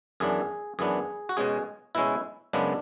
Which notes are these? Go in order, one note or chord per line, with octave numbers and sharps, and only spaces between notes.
F#2 E3 B3 D4 G#4
F#2 E3 B3 D4 G#4
F#4
B2 G#3 C#4 G#4
B2 G#3 C#4 E4
F#2 C#3 G#3 B3 D4